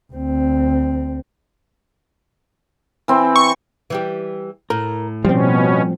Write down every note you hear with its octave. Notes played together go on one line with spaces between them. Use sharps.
D2 C4
E3 C4
C#6
E3 G3 G4
A2 A#4
B2 F3 G3 C4 C#4